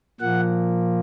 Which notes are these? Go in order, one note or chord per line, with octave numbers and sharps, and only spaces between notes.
A#2 F3 A#3 F#5